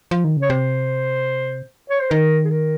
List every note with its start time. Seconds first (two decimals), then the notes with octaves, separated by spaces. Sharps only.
0.11 F3
0.24 D#3
0.37 C#3
0.42 C#5
0.50 C3 C5
1.90 C#5
2.01 C5
2.11 D#3 A#4
2.45 G#4
2.51 A#4